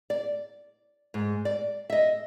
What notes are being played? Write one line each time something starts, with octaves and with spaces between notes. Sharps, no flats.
D5
G#2
D5
D#5 E5